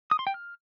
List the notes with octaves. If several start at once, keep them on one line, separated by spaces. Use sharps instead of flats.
D#6
C6
G5
F6